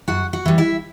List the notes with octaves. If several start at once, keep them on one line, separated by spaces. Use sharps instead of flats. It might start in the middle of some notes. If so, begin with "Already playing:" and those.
F#2 F#4 F#5
F#4 F#5
E3 G3
E4 E5